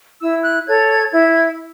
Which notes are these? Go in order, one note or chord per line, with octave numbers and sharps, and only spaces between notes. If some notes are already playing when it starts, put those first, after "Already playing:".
E4 E6
F#6
A4 C#5 G#6
G#6
E4 G#6